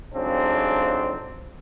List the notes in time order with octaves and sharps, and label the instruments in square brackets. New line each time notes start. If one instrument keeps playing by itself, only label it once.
[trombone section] F2 G#2 C#3 F#3 C4 D4